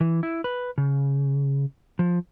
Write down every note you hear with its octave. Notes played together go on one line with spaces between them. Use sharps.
E3
E4
B4
C#3
F3